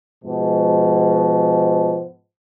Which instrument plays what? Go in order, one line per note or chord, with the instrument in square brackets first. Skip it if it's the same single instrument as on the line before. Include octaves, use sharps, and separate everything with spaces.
[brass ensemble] G#2 B2 F3 G#3